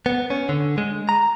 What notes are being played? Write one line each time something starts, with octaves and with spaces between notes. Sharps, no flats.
B3
C#4
D3
G#3
A#5